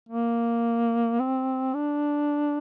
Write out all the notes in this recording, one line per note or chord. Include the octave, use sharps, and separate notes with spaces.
A#3
C4
D4